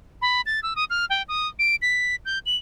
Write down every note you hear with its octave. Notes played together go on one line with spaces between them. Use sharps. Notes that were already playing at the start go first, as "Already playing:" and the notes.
B5
A6
E6
D#6
F6
G5
D#6
D7
B6
G6
F#7